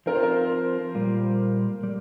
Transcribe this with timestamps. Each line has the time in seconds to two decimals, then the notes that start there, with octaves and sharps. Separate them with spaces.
0.06 F3 C4 F4 A#4
0.15 C5
0.23 A#4
0.95 A#2 G3 A#3 F4
1.83 G3